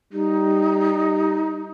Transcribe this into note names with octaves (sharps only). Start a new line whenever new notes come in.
G3 D#4